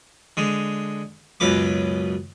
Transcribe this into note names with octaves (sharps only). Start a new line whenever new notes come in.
D3 G#3
C#2 F#2 B2 B4 D6